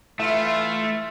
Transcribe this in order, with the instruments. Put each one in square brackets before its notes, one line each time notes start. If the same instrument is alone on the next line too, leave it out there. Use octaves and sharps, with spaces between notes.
[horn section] E3 E4 F4 [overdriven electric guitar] A3 [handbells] E5